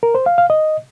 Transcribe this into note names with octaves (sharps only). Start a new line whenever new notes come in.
A#4
C5
F5
F5
D#5